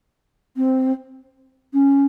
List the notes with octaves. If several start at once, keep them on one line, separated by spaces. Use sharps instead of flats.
C4
C#4